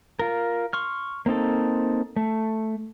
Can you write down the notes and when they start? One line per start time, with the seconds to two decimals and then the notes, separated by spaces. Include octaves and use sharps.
0.19 F4 A#4
0.73 C6 C#6 F6
1.26 A#3 C4 D#4 A4
2.16 A3